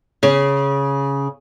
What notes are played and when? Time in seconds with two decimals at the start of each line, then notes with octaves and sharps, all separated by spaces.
0.23 C#3